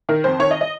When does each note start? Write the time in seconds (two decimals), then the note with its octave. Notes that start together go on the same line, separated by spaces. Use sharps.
0.09 D#3 A#4
0.24 F2 C5
0.39 D#3 C#5
0.51 D#5
0.61 D#5